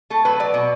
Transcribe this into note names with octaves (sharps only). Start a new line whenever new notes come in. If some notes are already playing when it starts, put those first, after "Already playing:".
A3 A4
F#3 B4
F#3 D5
B2